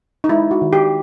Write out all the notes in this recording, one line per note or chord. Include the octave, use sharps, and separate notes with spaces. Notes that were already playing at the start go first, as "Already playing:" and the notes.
D#4
G#3 E4
F#4
D#3
G4